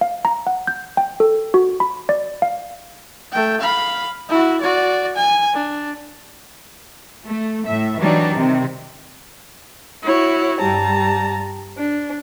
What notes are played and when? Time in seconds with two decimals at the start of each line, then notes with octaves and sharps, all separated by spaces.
0.01 F5
0.25 A#5
0.47 F#5
0.67 G6
0.97 G5
1.20 A4
1.54 F#4
1.80 B5
2.09 D5
2.42 F5
3.32 A3 G5
3.61 F5 B5
4.29 E4 F#4
4.61 F#4 D5
5.16 G#5
5.54 D4
7.26 A3
7.66 A2 E5
8.00 E3 F#3 G3 D4 D#4
8.34 C3 D#3
10.03 E4 F#4 C#5
10.60 G2 G3 A5 A#5
11.78 D4